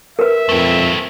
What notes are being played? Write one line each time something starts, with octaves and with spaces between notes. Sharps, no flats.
A#4 B4 E5
F2 A3 C4